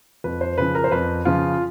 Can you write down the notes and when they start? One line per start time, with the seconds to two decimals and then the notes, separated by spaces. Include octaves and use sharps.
0.24 F2 B4
0.41 C5
0.58 C#3 F3 B4
0.75 A#4
0.84 C5
0.91 F2 B4
1.25 C#3 F3 F4